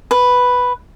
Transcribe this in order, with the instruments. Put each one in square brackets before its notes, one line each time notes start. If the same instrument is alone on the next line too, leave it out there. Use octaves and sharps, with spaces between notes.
[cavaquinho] B4